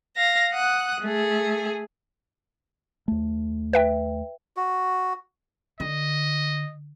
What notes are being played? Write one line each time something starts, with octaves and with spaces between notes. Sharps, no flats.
F5 A#6
F#5 D#6 F#6
A3 G#4
D#2 A3
B4 E5 G5
F#4
D3 D#5